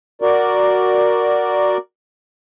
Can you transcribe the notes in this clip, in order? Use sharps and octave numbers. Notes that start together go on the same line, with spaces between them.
F#4 A#4 D5